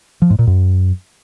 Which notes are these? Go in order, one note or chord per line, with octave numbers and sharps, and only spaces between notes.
F3
G#2
A#2
F#2